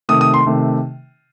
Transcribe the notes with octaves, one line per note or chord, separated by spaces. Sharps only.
C3 D#3 A3 D#6
D#6
C6
C3 D#3 A3